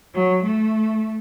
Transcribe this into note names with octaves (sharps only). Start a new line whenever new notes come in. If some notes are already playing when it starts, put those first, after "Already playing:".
F#3
A3